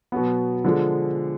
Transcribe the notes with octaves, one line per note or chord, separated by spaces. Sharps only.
B2 F#3 B3
D3 F3 G#3